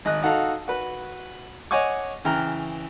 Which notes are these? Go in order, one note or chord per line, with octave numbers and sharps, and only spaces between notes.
G#1 D#5 F#6
D#4 F#4 A4 F5
F#4 B4
C#5 D#5 F#5 G#5 C#6 D6
C#3 E3 G5 A#5 F6